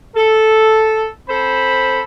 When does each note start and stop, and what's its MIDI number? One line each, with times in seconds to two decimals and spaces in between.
0.16 1.06 69
1.29 2.02 60
1.29 2.02 69
1.29 2.02 72
1.29 2.02 83